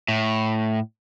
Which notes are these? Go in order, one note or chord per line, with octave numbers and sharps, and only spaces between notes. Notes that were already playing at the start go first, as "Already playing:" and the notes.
A2